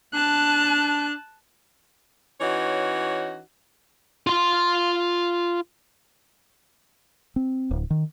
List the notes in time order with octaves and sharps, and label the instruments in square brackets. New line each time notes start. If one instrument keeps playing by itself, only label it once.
[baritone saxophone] D4 [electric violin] A5 F#6
[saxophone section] E3 C#4 D#4 F#4 C#5
[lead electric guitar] F4 C6
[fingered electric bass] C4
D1
D#3